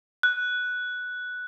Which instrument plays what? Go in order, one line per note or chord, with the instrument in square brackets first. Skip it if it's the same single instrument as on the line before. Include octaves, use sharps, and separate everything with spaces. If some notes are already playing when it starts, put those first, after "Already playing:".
[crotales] F#6